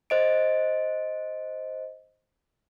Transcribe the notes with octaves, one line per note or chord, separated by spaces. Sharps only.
C5 D#5 D7